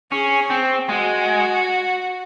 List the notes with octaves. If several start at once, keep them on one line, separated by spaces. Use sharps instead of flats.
C#4 G#4
C4
G#3 F#4